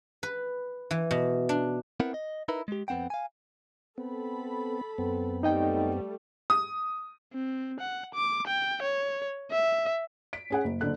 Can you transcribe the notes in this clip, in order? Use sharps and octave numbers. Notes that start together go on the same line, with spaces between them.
B4
E3
B2
D4
B3 C4 E4 A#4 F#5
D#5
D#4 E4 A#4 B4
G#3 G4
F2 B3 C4 F#5 G5
F5 G#5
B3 C4 A4 B5
F#2 B3 C4
G3 A3 D#4 D#5 G5
D#6
C4
F#5
D6
G5
C#5
E5
B6 D7
C#4 G#4 F#5
F#1
F#1 D3 A4 F#6